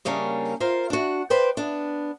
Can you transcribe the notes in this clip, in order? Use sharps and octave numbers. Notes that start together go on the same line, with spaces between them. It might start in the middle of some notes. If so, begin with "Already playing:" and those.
C#3 G3 A#3 C#4 D4
F4 A#4 C5 F5
D4 F#4
B4 C5 D5 G5
B3 D4